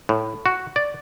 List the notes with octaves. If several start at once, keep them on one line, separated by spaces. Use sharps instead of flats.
A2
F#4
D5